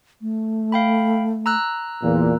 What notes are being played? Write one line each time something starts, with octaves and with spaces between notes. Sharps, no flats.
A3
F5 G5 B5
A#5 E6 F#6
E2 A#2